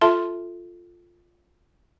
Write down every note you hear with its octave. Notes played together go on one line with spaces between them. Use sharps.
F4 A4 E5 A5 C6